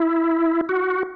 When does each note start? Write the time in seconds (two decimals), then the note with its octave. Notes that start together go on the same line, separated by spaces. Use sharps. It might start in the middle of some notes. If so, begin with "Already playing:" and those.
Already playing: E4
0.69 F#4